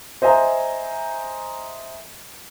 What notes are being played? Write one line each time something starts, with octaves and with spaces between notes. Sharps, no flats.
C5 D#5 E5 G#5 A#5